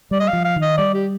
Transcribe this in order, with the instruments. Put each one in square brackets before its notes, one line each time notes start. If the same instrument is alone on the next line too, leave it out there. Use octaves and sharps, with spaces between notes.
[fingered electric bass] G3 [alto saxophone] D5
[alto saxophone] D#5
F5
[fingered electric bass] F3
[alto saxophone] F5
[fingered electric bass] D#3
[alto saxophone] D#5
[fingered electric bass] G3 [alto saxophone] D5
[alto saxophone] G4